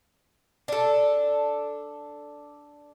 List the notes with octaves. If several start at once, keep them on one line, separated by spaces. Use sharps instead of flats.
D4 A4